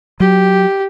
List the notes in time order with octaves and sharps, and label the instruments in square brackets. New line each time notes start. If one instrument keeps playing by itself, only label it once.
[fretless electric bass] F#3 [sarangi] G4